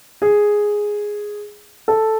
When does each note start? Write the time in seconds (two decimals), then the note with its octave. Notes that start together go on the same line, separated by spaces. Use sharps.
0.22 G#4
1.88 A4